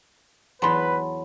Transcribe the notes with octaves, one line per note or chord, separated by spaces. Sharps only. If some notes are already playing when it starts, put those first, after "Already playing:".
E2 F#3 B4 A5 B5 C6